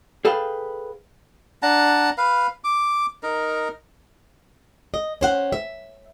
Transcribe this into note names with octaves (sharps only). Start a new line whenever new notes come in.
G#4 A4 B4 F5 G5
D4 F#5 A5 A#5
B4 F5
D6
D#4 A#4
D#5
C#4 C5 F#5
E5